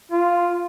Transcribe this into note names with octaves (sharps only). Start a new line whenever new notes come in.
F4